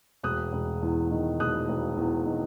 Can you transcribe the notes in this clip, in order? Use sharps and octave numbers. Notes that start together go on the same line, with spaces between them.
E1 D#6 F#6
E1
E2
D#3
E1 D#6 F#6
E1
E2
D#3